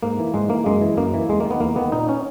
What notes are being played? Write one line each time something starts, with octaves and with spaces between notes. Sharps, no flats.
G#2 A#3
E3
G#2 G#3
E3 A#3
F#2 G#3
E3
F#2 A#3
E3
E2 G#3
D#3 A#3
B3
E2 A#3
D#3 B3
A#2 D#4
C#4